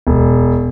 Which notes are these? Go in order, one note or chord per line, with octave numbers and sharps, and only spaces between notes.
E1